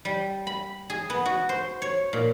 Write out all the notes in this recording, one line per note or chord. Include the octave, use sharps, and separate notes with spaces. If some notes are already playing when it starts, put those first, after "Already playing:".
G3
B5
G#4
B3
F#4
C5
C#5
A#2